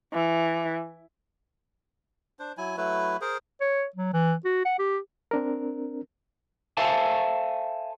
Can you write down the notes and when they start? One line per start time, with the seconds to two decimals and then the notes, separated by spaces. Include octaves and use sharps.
0.13 E3
2.39 D4 C5
2.58 F#3 E4 G#5
2.77 F#3 A3 E4 B4
3.21 G#4 A#4 C5
3.61 C#5
3.96 F#3
4.13 E3
4.45 F#4
4.65 F#5
4.79 G4
5.31 C4 D4 A#4
6.77 A4 C5 E5 F5 G#5 A5